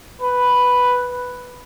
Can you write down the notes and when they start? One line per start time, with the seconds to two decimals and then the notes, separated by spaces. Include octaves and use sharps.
0.21 B4